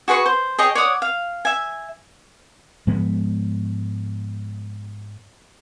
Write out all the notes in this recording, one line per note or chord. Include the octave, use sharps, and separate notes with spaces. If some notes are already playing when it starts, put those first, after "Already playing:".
F#4 G#4 B4 C#6
C5
G#4 C#5 D#5 G5
C#5 D5 F#5 D#6
F5
E5 G#5
G#2 F3 G#3 B3